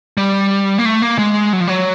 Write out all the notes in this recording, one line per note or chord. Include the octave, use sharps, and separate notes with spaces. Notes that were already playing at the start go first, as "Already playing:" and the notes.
G3
A#3
A3
A#3
G#3
F#3
F3
F#3